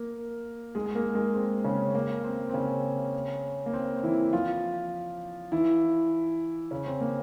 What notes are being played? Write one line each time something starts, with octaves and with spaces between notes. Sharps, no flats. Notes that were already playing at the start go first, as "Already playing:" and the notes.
Already playing: A#3 A#4
G#3 G#4
G#4
A#3 A#4
G#3 G#4
C4
C#3 C#4
A#3
C4
C4
C#3 C#4
A#3
C4
E3 E4
F3 F4
E3 E4
C#3 C#4
C4
A#3